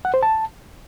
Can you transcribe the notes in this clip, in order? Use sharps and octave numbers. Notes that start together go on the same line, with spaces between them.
F#5
C5
A5